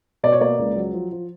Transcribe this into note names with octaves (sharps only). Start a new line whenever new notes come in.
B2 D5
C#5
A#3 D5
C#2
F#3
F3
F3